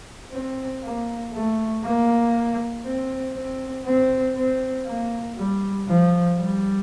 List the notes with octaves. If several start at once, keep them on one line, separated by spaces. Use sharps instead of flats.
C4
A#3
A3
A#3
C4
C4
C4
C4
A#3
G3
F3
G3